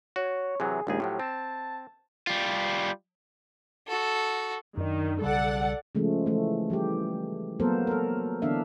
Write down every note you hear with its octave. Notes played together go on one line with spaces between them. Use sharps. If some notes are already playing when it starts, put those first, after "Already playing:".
F#4 C#5
C3 E3 F#3 G#4
A#1 D#2 G#3 G#4
A2 F3 F#3 G4
C4 A5
G3 F4
F#4 A4
F#2 D#3 D4
B1 C#3 G3 A4 D5 F#5
C#3 F3 G#3 A3
E3 A3
E3 G3 G4
F#3 A#3 B3 A4 A#4 C5
A4 A#4
D3 E3 B3 D4 E5 F5